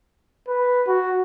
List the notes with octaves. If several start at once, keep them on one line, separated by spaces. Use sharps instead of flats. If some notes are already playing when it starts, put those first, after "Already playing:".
B4
F#4